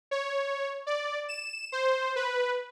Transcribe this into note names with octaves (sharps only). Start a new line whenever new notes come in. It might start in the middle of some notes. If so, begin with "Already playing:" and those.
C#5
D5
E7
C5
B4